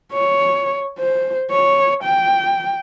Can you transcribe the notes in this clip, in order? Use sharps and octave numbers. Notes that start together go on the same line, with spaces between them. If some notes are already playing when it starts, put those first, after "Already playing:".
C#5
C5
C#5
G5